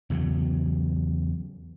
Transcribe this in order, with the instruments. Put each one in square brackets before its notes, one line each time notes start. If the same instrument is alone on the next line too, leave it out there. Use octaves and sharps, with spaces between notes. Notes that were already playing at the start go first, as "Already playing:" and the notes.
[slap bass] E2 C#3 F#3